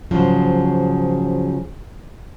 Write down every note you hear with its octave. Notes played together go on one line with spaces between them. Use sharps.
G#2 C#3 F3 F#3